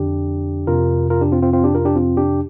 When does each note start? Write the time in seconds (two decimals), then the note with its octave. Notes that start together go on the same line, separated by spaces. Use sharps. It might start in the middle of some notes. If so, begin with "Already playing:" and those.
Already playing: F2 D3 D4 G4
0.67 F2 C3 F4 A#4
1.10 F4 A#4
1.21 D4 G4
1.32 C4 F4
1.42 C4 F4
1.53 C4 F4
1.64 D4 G4
1.75 F4 A#4
1.85 D4 G4
1.96 C4 F4
2.17 D4 G4